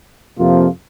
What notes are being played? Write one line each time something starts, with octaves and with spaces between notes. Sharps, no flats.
F2 C3 F3 A#3 F4